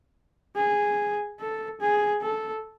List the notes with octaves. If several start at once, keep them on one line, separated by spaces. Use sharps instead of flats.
G#4
A4
G#4
A4